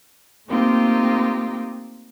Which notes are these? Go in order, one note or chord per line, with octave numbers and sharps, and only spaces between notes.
A3 A#3 C4 D#4 F4 G4